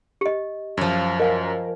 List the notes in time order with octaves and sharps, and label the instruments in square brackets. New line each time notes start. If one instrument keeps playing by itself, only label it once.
[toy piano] G4 D#5
[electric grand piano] F#2 [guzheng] F3 C#5
[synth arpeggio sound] A#4 [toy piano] D#5 F5 G#5